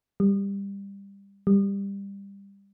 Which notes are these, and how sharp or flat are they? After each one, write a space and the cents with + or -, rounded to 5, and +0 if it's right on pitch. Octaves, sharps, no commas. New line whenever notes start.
G3 +20
G3 +20